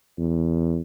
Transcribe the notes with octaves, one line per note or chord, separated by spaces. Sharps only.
E2